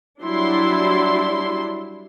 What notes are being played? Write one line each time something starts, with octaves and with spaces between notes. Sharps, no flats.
F#3 G3 D4 E4 C6